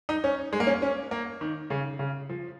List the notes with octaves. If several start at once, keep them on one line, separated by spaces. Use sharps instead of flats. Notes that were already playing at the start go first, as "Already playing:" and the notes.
D#4
C#4
G#3
A#3
C#4
C#4
A#3
D#3
C#3
C#3
F3